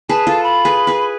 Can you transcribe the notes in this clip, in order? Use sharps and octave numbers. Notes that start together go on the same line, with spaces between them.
G#4 B4 A5
F4 A4
B5
G#4 B4
G#4 B4